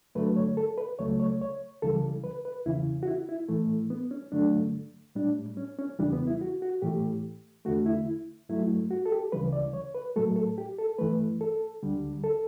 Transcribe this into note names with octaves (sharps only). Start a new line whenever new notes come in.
G2 D3 F#3 A3 B4
C#5
A4
B4
C#2 C#3 F#3 A3 C#5
C#5
C#5
C#2 C#3 E3 G3 A4
B4
B4
E2 C#3 E3 E4
F#4
E4
E4
A2 E3 A3
B3
C#4
G2 D3 F#3 A3 D4
A2 G3 D4
C#4
C#4
E2 C#3 E3 G3 D4
B3
E4
F#4
F#4
A2 E3 A3 G4
E2 D3 A3 F#4
E4
G2 F#3 A3 E4
F#4
A4
G4
D2 C#3 E3 G3 B4
D5
C#5
B4
A2 F#3 A3 A4
A4
G4
A4
G2 E3 A3 B4
A4
D2 D3 G3
A4